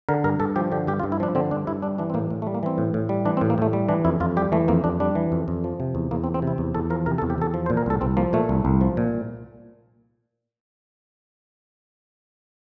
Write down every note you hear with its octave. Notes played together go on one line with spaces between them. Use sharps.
D3 A#4
G2 A#4
G2 A4
F3 G4
D3 G4
G2 G4
F4
G2
E4
F3 D4
D3 C4
G2 D4
G2 E4
G3 D4
E3 D4
C4
A2 A#3
A2
A3
G3
A#3
E3 C4
A2
A2
G3
E3 D4
C4
A2
A#3
A2 A3
G3
E3 D4
F2 E4
F2 F4
G3 G4
E3 A3
F2 A#3
F2 D4
G3 D4
E3
F2
F2
F3
C3
E2
E2 A#3
C4
F3
C4
C3
E4
E2
E2 A4
F3 A#4
C3 A#4
A4
E2
G4
E2 A4
F3
C5
A#2
A#4
C2 A4
C2 C4
F3 A#3
A#2 A3
C2
C2
F3
A#2